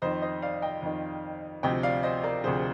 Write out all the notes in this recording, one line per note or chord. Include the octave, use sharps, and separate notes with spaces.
F2 D#3 C5 D#5
C5 D#5
D5 F5
D#5 G5
F2 D#3
D2 C3 F3 D#5 G5
D5 F5
C5 D#5
A#4 D5
D2 C3 F3 G#4 C5